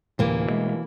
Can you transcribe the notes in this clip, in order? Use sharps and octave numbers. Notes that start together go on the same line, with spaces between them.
D2 A2 C3 E3 A#3
B2 G#3 A3